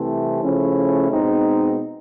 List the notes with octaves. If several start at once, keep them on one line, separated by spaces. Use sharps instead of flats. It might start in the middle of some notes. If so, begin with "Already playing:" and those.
Already playing: C2 C3 E3 A3 C4
C#3 F3 A3 C#4 E4
B2 G#3 C4 D#4